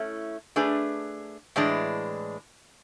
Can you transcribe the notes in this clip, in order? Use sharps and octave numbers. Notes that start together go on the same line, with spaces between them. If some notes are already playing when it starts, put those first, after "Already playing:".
Already playing: A3 C#4 E4
A3 D4 G#4 B4
A2 E3 G#3 D4